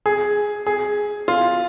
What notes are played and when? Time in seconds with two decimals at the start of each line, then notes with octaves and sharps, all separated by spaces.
0.06 G#4
0.67 G#4
1.28 F4